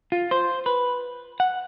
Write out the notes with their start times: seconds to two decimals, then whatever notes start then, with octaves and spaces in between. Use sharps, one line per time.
0.12 F4
0.31 C5
0.66 B4
1.40 F#5